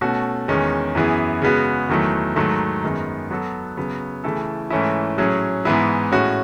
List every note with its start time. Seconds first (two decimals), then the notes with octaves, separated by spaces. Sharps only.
0.01 B2 A3 C#4 F#4 A4
0.48 E2 D#3 G#3 C#4
0.95 F#2 E3 B3 E4 G#4
1.42 C#3 G#3 B3 F#4
1.89 E2 D#3 F#3 A3 E4
2.36 G#2 D#3 F#3 A3
2.84 F#2 D#3 G#3 B3
3.30 F#3 B3 F#4 A4
3.77 C#3 F#3 B3
4.24 C#3 E3 A3 E4 A4
4.70 G#2 E3 A3 C#4 E4
5.18 A2 F#3 C#4 G#4
5.65 G#2 E3 B3 E4 G#4
6.12 A2 G#3 C#4 F#4